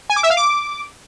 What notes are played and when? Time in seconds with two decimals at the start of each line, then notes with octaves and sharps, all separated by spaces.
0.10 G#5
0.16 D6
0.23 E5
0.30 F5
0.37 D6